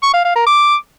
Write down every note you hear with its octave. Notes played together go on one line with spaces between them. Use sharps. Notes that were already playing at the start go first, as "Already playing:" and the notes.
C#6
F5
F5
A#4
D6